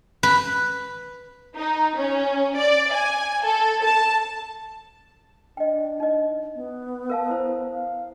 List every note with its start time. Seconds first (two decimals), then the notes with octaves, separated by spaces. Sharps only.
0.23 B4
1.57 D#4
1.97 C#4
2.57 D5
2.94 G#5
3.45 A4
3.85 A5
5.57 D4 D#5 G5
6.00 D#4 D#5
6.55 B3
7.10 A#4 F5 A5
7.30 E4 C5
7.72 F5